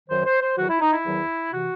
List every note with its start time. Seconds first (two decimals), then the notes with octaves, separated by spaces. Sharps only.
0.09 F#2 D#3 F#3 C5
0.25 C5
0.40 C5
0.56 E2 D#3 F#3 F#4
0.68 E4
0.80 D#4
0.91 E4
1.03 E2 D#3 F#3
1.51 C3 E3 F#4